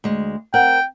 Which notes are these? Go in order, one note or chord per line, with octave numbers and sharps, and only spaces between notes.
D2 G#3
C4 A#4 F#5 G5